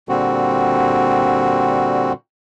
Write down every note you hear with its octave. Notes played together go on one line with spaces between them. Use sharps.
A#2 D3 G3 C4 F#4